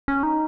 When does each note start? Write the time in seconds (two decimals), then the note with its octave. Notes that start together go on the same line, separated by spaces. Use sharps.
0.08 C#4
0.23 D#4